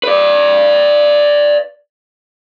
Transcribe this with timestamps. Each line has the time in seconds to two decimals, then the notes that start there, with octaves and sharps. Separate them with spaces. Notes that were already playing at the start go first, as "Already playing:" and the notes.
0.03 B4 D5